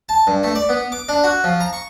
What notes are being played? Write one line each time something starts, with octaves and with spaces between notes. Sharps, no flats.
A5
G2
A3
D5
B3
D6
D4
F#4
F3
A#5
C#6